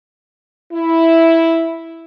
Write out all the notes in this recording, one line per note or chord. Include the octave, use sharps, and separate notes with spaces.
E4